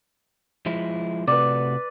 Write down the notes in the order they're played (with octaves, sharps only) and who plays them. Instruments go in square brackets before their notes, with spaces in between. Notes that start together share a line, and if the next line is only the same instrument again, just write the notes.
[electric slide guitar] F3 G#3 E4
[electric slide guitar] C3 A3 F#4 [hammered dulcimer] B4 D5